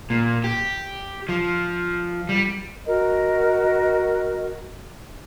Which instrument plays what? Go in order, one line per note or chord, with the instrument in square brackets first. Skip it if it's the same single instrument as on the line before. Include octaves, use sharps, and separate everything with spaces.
[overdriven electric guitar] A#2
G4
F3
G3
[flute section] F#4 A#4 D#5